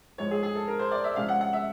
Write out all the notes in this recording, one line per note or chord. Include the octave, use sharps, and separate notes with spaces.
G#2 F3 G#3 C#5
G#4
G#4
A4
A#4
C5
D5
E5
C3 F3 G#3 C#4 F5
F#5
F#5
E5